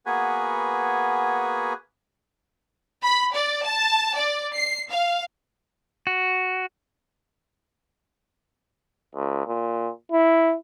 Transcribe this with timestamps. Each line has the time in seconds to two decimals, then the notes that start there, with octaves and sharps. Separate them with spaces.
0.06 A#3 B3 F#4 G#4 B4 G#5
3.03 B5
3.34 D5
3.65 A5
4.17 D5
4.56 C7
4.92 F5
6.07 F#4
9.15 C#2
9.47 A#2
10.12 E4